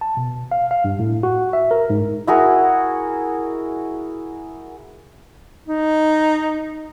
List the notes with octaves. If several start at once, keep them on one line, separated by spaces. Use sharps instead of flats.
A5
B2
F5
F5
G2
A2
F#4
E5
A#4
G#2
E4 F#4 G#4 A#4
D#4